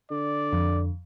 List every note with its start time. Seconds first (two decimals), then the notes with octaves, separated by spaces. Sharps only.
0.11 D3 D5
0.53 F2